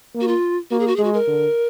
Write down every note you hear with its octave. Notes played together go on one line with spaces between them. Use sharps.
A#3
F#4
F4
A#3 F#4
G#4
F#4
G#3 G#4
F#4
A#4
D3